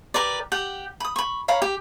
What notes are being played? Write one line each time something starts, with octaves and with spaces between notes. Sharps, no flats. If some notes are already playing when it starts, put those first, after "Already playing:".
G4 A#4 B4 D5
G4 F#5 G5
B5 D#6
B5 C#6
C#5 F5 A#5 B5
G4